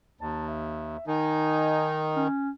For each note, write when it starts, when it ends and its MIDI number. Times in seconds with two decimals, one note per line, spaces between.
0.21 0.97 39
0.21 0.45 81
0.48 1.02 76
1.07 2.27 51
1.07 2.23 63
1.07 1.93 80
2.16 2.50 61